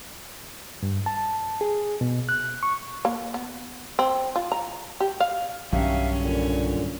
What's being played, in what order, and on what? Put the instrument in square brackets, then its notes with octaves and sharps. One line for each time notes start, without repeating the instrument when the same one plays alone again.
[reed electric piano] G2
A5
G#4
B2
F#6
C#6
[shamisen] A#3
B3
C4
F4
A#5
G4
F5
[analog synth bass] B1 [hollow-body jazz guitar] G2 D#3 F#3 [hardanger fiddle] C#4 [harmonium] E5 F5
[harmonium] A#2 D3